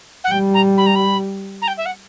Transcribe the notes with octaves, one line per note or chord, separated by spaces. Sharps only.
F#5
G3 G5
A#5
B5
A#5
B5
A#5
G5
E5
F#5